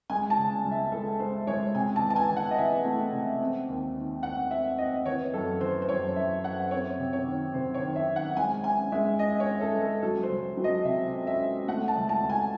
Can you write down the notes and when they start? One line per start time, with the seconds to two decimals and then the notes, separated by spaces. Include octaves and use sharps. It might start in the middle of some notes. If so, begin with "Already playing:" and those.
0.10 G#3 G#5
0.30 A5
0.37 C#3
0.64 C#2
0.71 E5
0.92 G#3 A4
1.20 G#3 C5
1.47 G#3 C#5
1.75 C3 G#5
1.96 A5
2.03 E3
2.10 A5
2.16 G#5
2.30 E3
2.37 F#5
2.51 D#5
2.57 E3 E5
2.85 A3
3.12 C3
3.41 C4
3.68 D#2
3.96 D#3
4.23 C4 F#5
4.51 C4 E5
4.78 C4 D#5
5.05 E3 C#5
5.34 F#2 A4
5.61 E3 C5
5.82 C5
5.89 F#2 C#5
6.16 F#2 E5
6.43 F#2 F#5
6.71 C4 C#5
6.99 C3
7.13 C#5
7.26 D#3
7.54 C3 C5
7.74 C#5
7.81 D#3
7.96 E5
8.09 D#3
8.16 F#5
8.37 G#3 G#5
8.64 C#4 G#5
8.92 G#3 E5
9.19 C#4 D#5
9.40 C#5
9.47 C#4
9.61 A4
9.75 G#3
9.82 A4
10.02 F#3 A4
10.23 C5
10.30 C#2
10.57 F#3
10.64 D#5
10.85 C3 E5
11.13 C#4
11.27 E5
11.40 C#4
11.68 A3 F#5
11.88 A5
11.96 C#2
12.09 A5
12.23 C#2
12.30 G#5